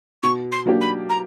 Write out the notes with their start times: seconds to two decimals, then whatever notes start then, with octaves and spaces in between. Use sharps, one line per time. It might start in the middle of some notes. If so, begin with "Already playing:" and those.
0.22 B2 C#6
0.51 C6
0.66 F#3 A#3 D4 G4
0.81 B5
1.09 A#5